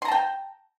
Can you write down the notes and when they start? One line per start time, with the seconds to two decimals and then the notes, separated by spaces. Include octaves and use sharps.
0.02 C6
0.05 A#5
0.08 A5
0.12 G5